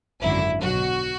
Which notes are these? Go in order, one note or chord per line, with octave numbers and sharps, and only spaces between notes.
G#1 F#2 D3 F#3 E4
B1 B2 F#3 F#4